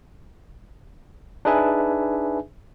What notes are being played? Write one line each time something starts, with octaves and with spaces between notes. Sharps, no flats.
D4 D#4 G#4 B4 E5 G#5